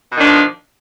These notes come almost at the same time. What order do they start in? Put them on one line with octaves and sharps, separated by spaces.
B2 D#3 D4 F3